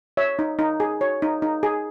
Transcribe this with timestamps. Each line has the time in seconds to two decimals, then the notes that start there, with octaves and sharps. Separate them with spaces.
0.17 C#5 E5
0.39 D#4
0.59 D#4
0.80 G#4
1.01 C#5
1.22 D#4
1.42 D#4
1.63 G#4